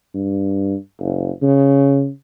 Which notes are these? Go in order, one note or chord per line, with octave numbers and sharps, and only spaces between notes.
G2
F#1
C#3